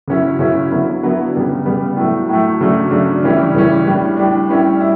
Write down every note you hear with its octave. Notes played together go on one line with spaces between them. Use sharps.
C#3 F#3 C#4 E4
C#3 F#3 C#4 E4
D3 F#3 B3 E4
D3 F#3 B3 E4
C#3 G3 B3
C#3 G3 B3
A2 F#3 A3
A2 F#3 A3
C#3 F#3 A3 D4
C#3 F#3 A3 D4
C#3 E3 G3 C#4 E4
C#3 E3 G3 C#4 E4
A2 G3 D4
A2 G3 D4
A2 G3 C#4 E4
E4